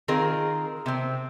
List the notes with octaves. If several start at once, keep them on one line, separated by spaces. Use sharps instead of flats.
D#3 C4 F4 G#4 A#4
C3 C4